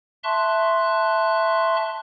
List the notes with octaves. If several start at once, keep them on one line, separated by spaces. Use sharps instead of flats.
E5 A5 C6 C#6 F#6